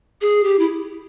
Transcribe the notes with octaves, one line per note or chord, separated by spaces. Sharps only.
G#4
G4
E4